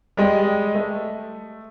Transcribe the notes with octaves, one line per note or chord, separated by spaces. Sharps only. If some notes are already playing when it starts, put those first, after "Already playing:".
G3 G#3 D#5
A3